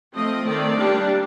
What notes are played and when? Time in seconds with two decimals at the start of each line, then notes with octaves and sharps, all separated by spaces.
0.14 F3 A3 C4 D#5
0.46 D#3 A3 C4 D5
0.78 G3 A#3 D4